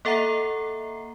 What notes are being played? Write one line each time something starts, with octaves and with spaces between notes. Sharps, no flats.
A#3 A4 E5 F#5 A#5 C7